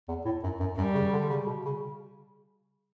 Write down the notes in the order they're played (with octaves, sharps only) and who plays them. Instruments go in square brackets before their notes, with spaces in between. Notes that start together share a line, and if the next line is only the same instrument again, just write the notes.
[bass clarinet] E2
A2
F#2
F#2
[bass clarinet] F#2 [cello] G3
[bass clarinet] C#3
D3
C#3
B2
C#3